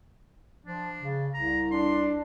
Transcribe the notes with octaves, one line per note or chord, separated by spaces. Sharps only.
F3 D4
C#3
C2 A#5
D4 C6